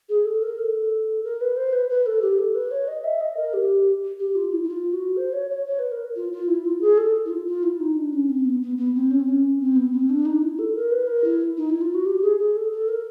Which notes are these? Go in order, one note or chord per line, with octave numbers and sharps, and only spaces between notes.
G#4
A4
A#4
A4
A#4
B4
C5
B4
B4
A4
G4
A4
B4
C#5
D#5
E5
D#5
A#4
G4
G4
F4
E4
E4
F4
F#4
C5
C#5
C#5
C#5
B4
A#4
F4
F4
E4
F4
G#4
A4
E4
F4
F4
E4
D#4
D4
C#4
C4
B3
B3
B3
C4
C#4
C4
C#4
C4
B3
C4
D4
D#4
E4
A4
A#4
B4
A#4
E4
D#4
E4
F4
F#4
G4
G#4
G#4
A4
A4
A#4